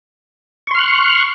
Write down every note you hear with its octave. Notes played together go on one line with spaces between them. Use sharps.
C6 C#6 F6 F#6